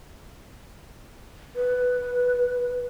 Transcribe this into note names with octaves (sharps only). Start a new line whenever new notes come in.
B4